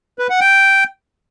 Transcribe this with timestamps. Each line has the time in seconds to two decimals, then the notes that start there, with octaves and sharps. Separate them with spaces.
0.19 B4
0.30 F#5
0.41 G5